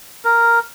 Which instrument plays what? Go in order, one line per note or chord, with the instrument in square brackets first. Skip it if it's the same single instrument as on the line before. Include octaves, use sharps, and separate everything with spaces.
[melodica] A#4